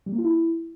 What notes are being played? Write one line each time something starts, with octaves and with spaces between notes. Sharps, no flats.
G3
A#3
F4
E4